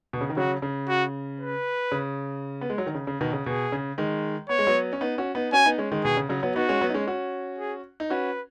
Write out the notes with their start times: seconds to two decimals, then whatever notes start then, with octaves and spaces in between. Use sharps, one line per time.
0.13 B2
0.21 C#3
0.29 D#3
0.37 C#3 F#3 F#4
0.62 C#3
0.89 F#4
1.40 B4
1.92 C#3
2.61 B3
2.70 G#3
2.78 F#3
2.86 D#3
2.95 C#3
3.07 C#3
3.20 B2 D#3
3.33 C#3
3.46 B2 G#4
3.72 C#3
3.98 D#3 G#3
4.49 B3 C#5
4.59 G#3
4.67 F#3 B3
4.93 C#4
5.01 B3 D#4
5.18 C#4 F#4
5.35 B3 D#4
5.52 C#4 F#4 G#5
5.66 B3 D#4
5.78 G#3 C#4
5.92 D#3 G#3
6.04 B2 D#3 G#4
6.17 C#3
6.29 C#3 F#3
6.43 F#3 B3
6.56 B3 D#4 F#4
6.69 G#3 C#4
6.81 F#3 B3
6.90 D#4
6.94 G#3 C#4
7.07 C#4 F#4
7.59 G#4
8.00 D#4
8.10 C#4 F#4 B4